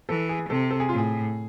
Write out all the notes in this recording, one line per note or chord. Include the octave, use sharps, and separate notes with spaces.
E3 A4
G#4
C3 A4
A4
G#4
A2 F4
G#4